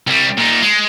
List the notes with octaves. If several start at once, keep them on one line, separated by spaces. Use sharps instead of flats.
C2 G3
A#2 D#4
G#3